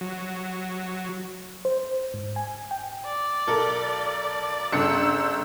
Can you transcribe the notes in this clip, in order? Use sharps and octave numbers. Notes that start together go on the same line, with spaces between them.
F#3
C5
G#2
G#5
G5
D5
B1 A4 A#4
G1 C#3 A4 E6 C#7